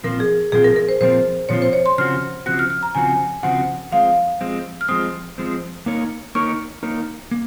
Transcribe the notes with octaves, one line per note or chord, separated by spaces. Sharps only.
A#2 F3 C4 F4 A#4
G#4
A#2 F3 C4 F4 G#4
A#4
A#4
C5
A#2 F3 C4 F4 C5
A#2 F3 C4 F4 C#5
C5
C#5
C6
C#3 F3 C4 F#4 F6
C#3 F3 C4 F#4 F#6
F6
F6
A#5
C#3 F3 C4 F#4 G#5
C#3 F3 C4 F#4 F#5
F3 G#3 C4 F5
F3 G#3 C4
F6
F3 G#3 C4 D#6
F3 G#3 C4
A#3 D#4 A#4 C#5
A#3 D#4 A#4 C#5 C#6
A#3 D#4 A#4 C#5
A#3